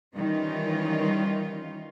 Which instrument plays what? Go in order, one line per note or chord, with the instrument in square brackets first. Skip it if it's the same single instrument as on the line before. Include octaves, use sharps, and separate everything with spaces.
[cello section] D#3 E3 G3 C#4 D#4 F4